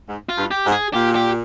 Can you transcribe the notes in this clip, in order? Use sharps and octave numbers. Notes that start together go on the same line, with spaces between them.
G#2
F4
G2
G4
G#2
G#4
A#2 G4
G4